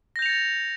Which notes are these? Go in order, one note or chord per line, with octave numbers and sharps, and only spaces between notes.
G6 A6 A#6 C#7 F7